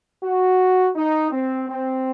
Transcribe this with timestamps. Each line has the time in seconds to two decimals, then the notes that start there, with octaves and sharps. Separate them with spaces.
0.24 F#4
0.95 D#4
1.31 C4
1.68 C4